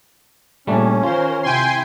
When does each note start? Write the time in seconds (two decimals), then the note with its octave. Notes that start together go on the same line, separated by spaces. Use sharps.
0.67 A#2 C#3 G3 A3 C#4 D4
1.03 D#3 F4 A#4 C5
1.43 C3 E4 G5 G#5 C6